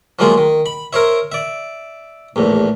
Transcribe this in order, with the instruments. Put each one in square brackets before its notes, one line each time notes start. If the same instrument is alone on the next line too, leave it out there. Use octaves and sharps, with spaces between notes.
[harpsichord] F3 F#3 G#3 A#3 F4
D#3
B5
A#4 C5 C#5 E5
D5 E5
A#1 E2 A2